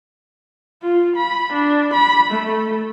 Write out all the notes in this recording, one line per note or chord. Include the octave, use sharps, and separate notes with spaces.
F4
B5
D4
B5
A3